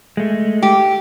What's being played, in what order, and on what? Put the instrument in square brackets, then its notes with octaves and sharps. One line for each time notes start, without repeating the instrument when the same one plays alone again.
[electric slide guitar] G#3 A3
[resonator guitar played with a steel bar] G4